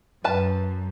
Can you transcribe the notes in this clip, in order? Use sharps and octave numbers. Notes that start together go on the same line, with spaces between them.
F#2 B4 A5